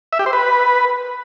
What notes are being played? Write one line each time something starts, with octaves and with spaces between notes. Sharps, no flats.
E5
G4
C5
B4